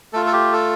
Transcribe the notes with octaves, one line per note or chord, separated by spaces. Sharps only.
A3 F4 A4
A4
G4
A4